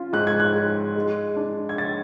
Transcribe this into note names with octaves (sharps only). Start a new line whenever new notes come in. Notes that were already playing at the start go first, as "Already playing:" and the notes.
Already playing: C#4 F4
G#2 F#6
G#6
F#6
G#3
G#3
D4
G#6
A6